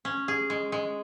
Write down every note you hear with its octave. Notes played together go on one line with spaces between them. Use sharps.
C#4
G#4
G#3
G#3